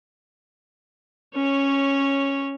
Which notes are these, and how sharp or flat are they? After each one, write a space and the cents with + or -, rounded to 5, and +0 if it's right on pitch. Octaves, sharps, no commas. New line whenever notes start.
C#4 -10 C#5 +0